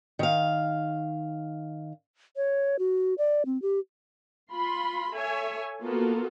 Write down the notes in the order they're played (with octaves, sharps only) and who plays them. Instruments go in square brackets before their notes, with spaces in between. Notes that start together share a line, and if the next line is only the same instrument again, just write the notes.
[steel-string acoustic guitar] D#3 F5
[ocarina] C#5
F#4
D5
C4
G4
[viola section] F4 B5 C6
A4 C#5 E5 G#5
A#3 B3 F4 F#4 A4 A#4